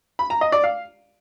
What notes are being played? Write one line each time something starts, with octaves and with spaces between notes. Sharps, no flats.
B5
A#5
D#5
D5
F5